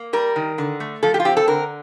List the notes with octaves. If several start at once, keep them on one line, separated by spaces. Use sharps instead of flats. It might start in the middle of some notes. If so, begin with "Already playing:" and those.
Already playing: A#3
G3 A#4
D#3
D3
A3
F3 A4
G4
F4
C4 G4
A4
D3 A#4